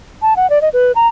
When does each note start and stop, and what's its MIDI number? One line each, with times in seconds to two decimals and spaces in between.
0.22 0.34 81
0.36 0.49 78
0.50 0.61 74
0.62 0.69 75
0.73 0.92 71
0.96 1.08 82